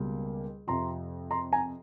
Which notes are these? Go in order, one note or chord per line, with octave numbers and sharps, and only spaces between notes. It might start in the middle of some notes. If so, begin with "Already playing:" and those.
Already playing: C#2 B2 G3 A#3
F2 C3 F3 A#5 C6
A#5 C6
G#5 A#5